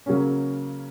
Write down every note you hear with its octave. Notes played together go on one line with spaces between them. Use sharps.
C#3 F#3 A#3 C#4